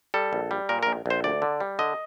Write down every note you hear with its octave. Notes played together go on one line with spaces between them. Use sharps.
G3 A4
A#1
G3
A#2 A#4
A#1 A#4
A#1 C5
D2 D5
D3
G3
D3 D#5